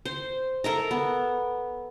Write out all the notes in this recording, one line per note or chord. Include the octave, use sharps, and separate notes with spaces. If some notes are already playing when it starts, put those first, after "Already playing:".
C5
A4 A#4 E5 A#5
B3